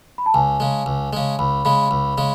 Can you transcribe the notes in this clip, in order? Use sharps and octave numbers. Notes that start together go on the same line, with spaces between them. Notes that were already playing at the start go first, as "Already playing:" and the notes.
B5
A5
C#2 G#5
C#3 G#3
C#2
C#3 G#3
C#2 B5
C#3 G#3 B5
C#2
C#3 G#3